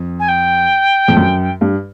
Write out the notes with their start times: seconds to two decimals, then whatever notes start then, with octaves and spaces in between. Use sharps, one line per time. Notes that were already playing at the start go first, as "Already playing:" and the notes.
Already playing: F2
0.19 G#5
0.28 G5
1.08 F2
1.17 F#2
1.61 G2